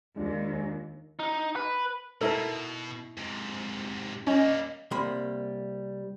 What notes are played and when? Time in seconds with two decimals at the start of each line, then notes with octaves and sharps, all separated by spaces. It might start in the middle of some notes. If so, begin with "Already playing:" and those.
0.16 D#2 G#3 D4 F4
1.19 D#4
1.56 B4
2.21 B2 D#4 E4 A4 A#4 A5
3.17 G#2 C3
4.27 G3 A#3 C#4 D#5
4.91 C2 G3 A#3 B5 C6